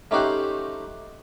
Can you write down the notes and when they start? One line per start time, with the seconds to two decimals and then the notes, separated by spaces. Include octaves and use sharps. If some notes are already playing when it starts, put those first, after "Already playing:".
0.11 A3 C#4 D#4 G4 C5 F#5